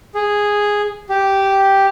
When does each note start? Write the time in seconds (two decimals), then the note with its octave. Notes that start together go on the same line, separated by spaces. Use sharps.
0.15 G#4
1.09 G4